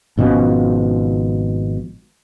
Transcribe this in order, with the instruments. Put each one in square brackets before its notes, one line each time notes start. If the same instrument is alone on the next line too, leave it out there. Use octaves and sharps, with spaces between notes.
[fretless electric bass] G#1 B2 F3 C#4